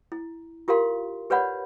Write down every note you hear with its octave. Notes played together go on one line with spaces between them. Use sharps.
E4
F4 G4 A#4 F5 C6
G4 B4 C#5 D5 F#5 B5